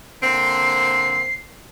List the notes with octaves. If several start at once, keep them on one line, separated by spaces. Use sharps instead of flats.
D3 A#3 C4 C7